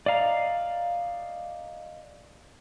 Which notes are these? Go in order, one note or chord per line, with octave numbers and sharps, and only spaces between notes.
D5 D#5 F5 A#5